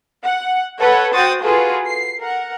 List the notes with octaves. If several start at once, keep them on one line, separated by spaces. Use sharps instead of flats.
F#5
A4 B4 C#5 F#5
F#4 C5 G5 D#6 A6
F4 F#4 G#4 A4 B4
C7
A#4 F#5